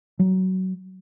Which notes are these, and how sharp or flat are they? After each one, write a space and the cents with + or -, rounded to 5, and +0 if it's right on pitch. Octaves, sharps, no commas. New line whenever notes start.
F#3 +20